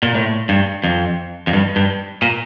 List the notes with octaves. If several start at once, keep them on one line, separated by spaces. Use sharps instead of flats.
A#2
A2
G2
F2
F2
G2
G2
A#2